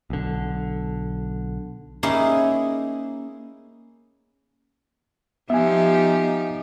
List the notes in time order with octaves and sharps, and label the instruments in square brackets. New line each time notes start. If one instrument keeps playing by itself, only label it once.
[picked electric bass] B1 D3
[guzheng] A#3 C#4 D#4 E4 G#4
[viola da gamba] F3 D#4 G4 [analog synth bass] B3 [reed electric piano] E5 G#5